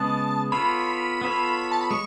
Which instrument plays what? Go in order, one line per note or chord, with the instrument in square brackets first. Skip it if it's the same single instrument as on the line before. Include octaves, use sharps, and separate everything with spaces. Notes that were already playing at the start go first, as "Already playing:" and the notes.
Already playing: [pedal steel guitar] C#3 G#3 B3 [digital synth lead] A5
[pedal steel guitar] B3 F4 A4 C#5 [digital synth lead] B5
[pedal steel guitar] B3 F4 A4 C#5
[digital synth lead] A5
B5
[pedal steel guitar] G#3 [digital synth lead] C#6